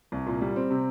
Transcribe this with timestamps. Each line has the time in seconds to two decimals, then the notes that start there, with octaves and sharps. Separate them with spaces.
0.12 C2
0.26 A#2
0.41 G3
0.56 C4
0.70 C3